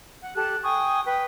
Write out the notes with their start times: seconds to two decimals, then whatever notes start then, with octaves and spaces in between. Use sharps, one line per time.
0.22 F#5
0.36 G4 A4 A5 F#6
0.63 G5 G#5 C#6 D#6
1.05 B4 G5